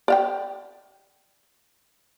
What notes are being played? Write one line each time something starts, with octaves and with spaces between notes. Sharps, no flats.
D5 F5 G5